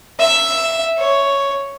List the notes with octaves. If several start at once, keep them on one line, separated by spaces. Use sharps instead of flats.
E5
C#5